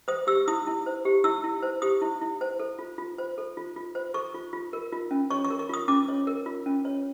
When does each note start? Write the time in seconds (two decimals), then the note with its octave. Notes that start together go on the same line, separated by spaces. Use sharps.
0.08 C5 D#6
0.27 G4 E6
0.47 E4 D#6
0.67 E4
0.86 C5
1.05 G4
1.24 E4 E6
1.44 E4
1.62 C5
1.82 G4 D#6
2.01 E4
2.21 E4
2.41 C5
2.59 A4
2.79 F4
2.98 F4
3.18 C5
3.38 A4
3.57 F4
3.76 F4
3.95 C5
4.14 A4 C#6
4.34 F4
4.53 F4
4.73 A#4
4.92 F4
5.11 C#4
5.30 C#5 C#6
5.44 C#6
5.50 A#4
5.59 C#6
5.69 F4 D#6
5.88 C#4 D6
6.09 C#5
6.27 A#4
6.46 F4
6.66 C#4
6.85 C#5